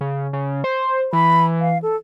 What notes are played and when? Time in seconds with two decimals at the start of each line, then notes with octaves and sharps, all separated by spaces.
0.01 C#3
0.33 C#3
0.64 C5
1.13 E3 B5
1.60 F5
1.82 A4